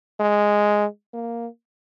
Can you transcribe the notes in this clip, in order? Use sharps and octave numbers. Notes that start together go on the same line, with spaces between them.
G#3
A#3